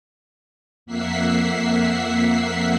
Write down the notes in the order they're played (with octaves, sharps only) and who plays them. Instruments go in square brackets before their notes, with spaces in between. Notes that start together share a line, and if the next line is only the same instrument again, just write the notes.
[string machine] F2 A#3 E5 F#5 B6 C7